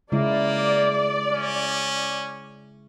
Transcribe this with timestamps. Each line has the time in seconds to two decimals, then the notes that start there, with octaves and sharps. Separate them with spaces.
0.12 C#3 G#3 A#3 E4 D5
1.31 C#4